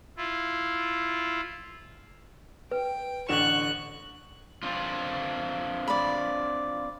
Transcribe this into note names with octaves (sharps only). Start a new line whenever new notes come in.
E4 F4
B4 G5
A1 D3 C#6 F#6 E7
C4 D4 F4
D5 B5